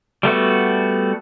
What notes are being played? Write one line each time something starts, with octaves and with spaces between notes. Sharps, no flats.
G3 A3 B3 F#4